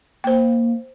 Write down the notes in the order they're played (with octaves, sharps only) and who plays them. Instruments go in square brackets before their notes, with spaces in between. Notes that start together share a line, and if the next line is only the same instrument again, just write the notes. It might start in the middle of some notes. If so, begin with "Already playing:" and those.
[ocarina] A#3 [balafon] C5 G5